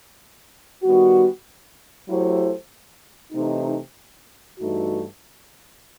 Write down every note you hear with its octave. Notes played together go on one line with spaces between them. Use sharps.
D#3 G3 B3 F#4
F#3 A3 E4 G4 C5
C3 E3 A3 D#4
G2 E3 A3 D#4 F#4